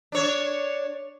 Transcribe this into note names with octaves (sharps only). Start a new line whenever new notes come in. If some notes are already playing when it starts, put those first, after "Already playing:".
D4 C#5